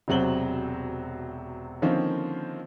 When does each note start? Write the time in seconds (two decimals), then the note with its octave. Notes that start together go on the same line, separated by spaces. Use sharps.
0.08 E1 C3 F#3 C4 F#7 G7
1.82 D3 D#3 F3 A#3 C4 C#4